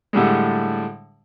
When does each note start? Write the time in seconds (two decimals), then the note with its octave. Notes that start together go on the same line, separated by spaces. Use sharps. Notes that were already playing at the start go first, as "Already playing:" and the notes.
0.13 A2 D3 G3 G#3